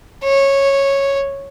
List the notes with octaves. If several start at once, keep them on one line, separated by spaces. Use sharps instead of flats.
C#5